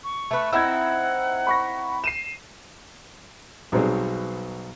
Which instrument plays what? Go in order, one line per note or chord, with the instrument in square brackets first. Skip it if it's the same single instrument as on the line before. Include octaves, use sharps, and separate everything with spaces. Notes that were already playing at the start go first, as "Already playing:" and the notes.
[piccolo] C#6
[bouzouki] A3 B4
[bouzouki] C4 D#4 E4 [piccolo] F#5 [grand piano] E6 G#6
[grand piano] B5 C#6 A#6
C7 D#7 E7
[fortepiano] B1 B2 F#3 G3 C4 G#4